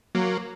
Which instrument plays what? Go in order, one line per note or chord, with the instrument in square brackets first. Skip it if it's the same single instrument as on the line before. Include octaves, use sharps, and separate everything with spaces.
[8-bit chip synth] F#3 A#3